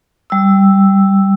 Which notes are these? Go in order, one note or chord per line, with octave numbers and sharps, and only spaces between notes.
G3 E6